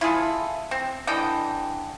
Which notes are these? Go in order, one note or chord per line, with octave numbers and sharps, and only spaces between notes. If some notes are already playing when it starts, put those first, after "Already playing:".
E4 F4 G#4 A4
C4
D3 E3 D#5 G5